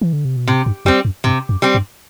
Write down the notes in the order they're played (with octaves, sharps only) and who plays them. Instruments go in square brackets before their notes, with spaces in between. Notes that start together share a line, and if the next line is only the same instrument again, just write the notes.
[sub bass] E3
D3
C3
B2
[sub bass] A2 [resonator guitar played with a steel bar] C3
[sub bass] G2
[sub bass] E2 [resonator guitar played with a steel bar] G3 C4
[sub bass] F#2
[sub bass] G2 [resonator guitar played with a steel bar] C3
[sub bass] F#2
[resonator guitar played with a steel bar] G3 C4
[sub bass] G2